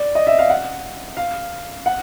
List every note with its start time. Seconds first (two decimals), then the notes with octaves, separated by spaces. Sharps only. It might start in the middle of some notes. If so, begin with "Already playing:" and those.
Already playing: D5
0.15 D#5
0.27 E5
0.39 F5
0.50 F#5
1.17 F5
1.86 F#5